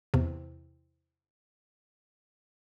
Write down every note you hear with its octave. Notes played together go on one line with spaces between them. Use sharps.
E2 C3